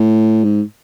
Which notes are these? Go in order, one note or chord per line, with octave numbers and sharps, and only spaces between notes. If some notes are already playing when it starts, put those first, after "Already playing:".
Already playing: A2
G#2